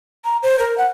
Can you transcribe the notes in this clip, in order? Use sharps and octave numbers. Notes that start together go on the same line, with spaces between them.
A#5
C5
A#4
F#5